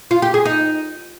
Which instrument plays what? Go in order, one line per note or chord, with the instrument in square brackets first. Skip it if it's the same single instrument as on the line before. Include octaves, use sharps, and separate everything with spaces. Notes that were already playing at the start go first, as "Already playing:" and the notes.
[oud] F4
G4
G#4
D#4